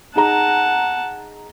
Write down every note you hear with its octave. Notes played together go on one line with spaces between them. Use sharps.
D#4 G#4 F#5 A5 A#5